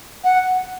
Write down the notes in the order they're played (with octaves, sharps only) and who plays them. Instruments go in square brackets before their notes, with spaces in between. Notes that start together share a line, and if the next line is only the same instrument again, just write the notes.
[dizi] F#5